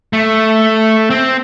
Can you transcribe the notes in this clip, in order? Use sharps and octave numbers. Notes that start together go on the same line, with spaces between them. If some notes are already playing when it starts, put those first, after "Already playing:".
A3
C4